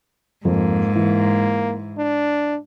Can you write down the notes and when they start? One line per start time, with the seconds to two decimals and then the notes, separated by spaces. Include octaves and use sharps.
0.45 F2 G#2 A#3
0.95 E3 A#3
1.98 D4